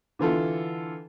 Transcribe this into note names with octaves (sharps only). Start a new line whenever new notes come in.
D3 E3 F4 A4